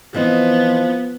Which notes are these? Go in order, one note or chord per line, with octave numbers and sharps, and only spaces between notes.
E3 F3 B3 C4 D#5